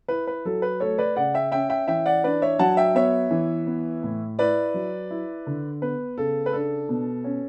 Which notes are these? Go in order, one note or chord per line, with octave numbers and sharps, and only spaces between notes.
E4 B4
B4
F#3 A4
B4
A3 A4 C#5
B4 D5
C#3 D5 F#5
E5 G5
C#4 E5 G5
E5 G5
E3 E5 G5
D5 F#5
D4 B4 D5
C#5 E5
F#3 F#5 A5
E5 G5
B3 C#5 E5
E3
B3
A2
E4 B4 D5
F#3
E4
D3
B3 B4
C#3 A4
B4
D4 A4
B2
C#4